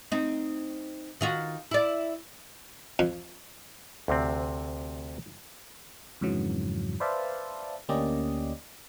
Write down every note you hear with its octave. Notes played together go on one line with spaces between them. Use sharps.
C4 D#4
D#3 F4 F#4
E4 D5
F2
D2 C3 C4
F2 G#2 C#3 E3 F#3
B4 C5 D5 E5 F5 A5
D2 A#3 C#4 G4 D5 D#5